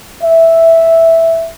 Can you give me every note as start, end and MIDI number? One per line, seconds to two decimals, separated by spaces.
0.22 1.48 76